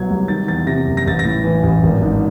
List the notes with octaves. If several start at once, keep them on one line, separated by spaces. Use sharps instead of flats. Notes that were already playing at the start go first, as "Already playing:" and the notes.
Already playing: C2 B2 F#3 G#6
C2
D#3 A6
E2 A6
C3 A#6
F#1
A#6
A1 A6
A#6
A2
E3
A1
G#1
G#2